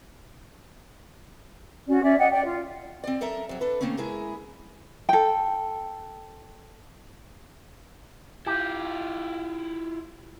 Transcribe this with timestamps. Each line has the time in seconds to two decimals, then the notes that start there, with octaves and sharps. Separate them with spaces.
1.88 C#4 F#4 D5
2.01 C#4 D5 E5
2.18 D5 D#5 F#5 G5
2.31 D5 G5
2.44 F4
3.04 C4 D5
3.21 F#2 A4 A#4 E5 A5
3.49 F2 F#3
3.61 D4 A4 B4
3.81 D#3 F#3 A3 A#3 C4 C#4
3.97 G#3 E4 G#4 A#4
5.09 A4 G5
8.46 E4 F4 G4